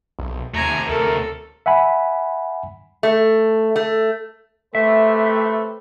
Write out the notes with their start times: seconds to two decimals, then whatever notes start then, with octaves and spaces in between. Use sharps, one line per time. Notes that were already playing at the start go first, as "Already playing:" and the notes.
0.19 B1
0.54 D#2 C3 A3 G#5 A#5
0.89 D2 A4 A#4
1.66 E5 F#5 G#5 B5
3.03 A3
3.76 A3
4.75 A3 C4 G4 A4 B4 E5